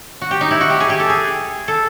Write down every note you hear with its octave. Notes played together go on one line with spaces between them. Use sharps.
F#4
G4
D#4
E4
F#4
G4
G#4
G4
A4
G#4
A4